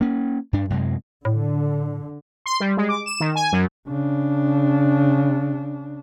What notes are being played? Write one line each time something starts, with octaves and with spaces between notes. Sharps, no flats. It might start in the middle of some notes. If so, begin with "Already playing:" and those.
A#3 C#4
G2 D4
F#2 C3 G#3
A2 D3
C6
G3
G#3
D6
E7
D#3
G#5
F#2
C#3 D4